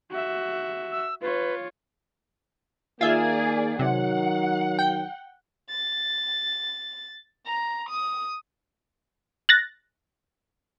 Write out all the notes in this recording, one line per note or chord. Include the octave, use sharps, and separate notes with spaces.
F#4 E5
E6
F4 B4 C#5
D#3 A#3 F4 G#4 D5 E5
C3 D#3 F#3 F#5
G5
A6
A#5
D#6
F#6 A6 A#6